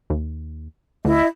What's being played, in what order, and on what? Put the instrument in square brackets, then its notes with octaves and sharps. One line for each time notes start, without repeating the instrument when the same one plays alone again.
[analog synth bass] D#2
[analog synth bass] D2 [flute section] E4 D#5